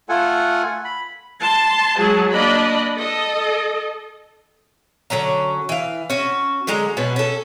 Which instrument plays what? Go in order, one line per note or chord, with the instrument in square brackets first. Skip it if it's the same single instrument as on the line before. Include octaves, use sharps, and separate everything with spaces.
[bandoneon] A3 F4 A4 F#5 G#5
B5
[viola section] A5 C6
F#3 G#3 G#4 A5
A#3 D4 D5 D#5 B5
A4 D#5
[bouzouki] D3 F#3 C#4 A#5
E3 F5
C#4 F#4
D3 F#3 G#3 A#5
B2 F#3 B3
C#4 A4